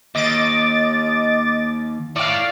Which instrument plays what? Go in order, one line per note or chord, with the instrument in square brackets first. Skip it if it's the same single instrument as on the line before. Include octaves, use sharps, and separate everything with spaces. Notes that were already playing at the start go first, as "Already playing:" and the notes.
[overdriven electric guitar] D#2 [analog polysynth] D#5 D6 A6
[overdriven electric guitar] E4 C#5 [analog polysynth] D5 F5